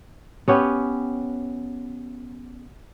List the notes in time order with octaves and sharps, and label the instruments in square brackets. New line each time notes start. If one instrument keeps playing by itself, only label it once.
[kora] B3 C#4 G4